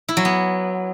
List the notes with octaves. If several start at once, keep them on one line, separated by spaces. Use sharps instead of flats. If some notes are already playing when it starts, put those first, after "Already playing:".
E4
F#3
B3